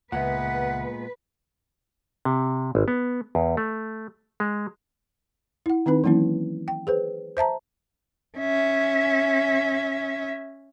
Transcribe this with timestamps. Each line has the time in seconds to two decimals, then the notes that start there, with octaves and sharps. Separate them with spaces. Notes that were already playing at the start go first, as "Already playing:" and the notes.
0.12 C#2 A#2 C#3 G#3 B3 B4 E5 F#5
2.25 C3
2.75 G#1
2.88 B3
3.35 E2
3.57 A3
4.40 G#3
5.66 E4 F#5
5.86 D#3 C4 D#4 B4 B5
6.04 E3 F#3 A#3 C#4 E4
6.68 G5
6.87 G#4 B4 C5
7.37 C5 E5 A5 A#5
8.38 C#4 E5